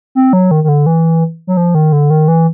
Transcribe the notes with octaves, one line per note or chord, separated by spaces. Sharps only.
C4
F#3
D#3
D#3
D3
E3
F#3
F3
D#3
D3
D#3
E3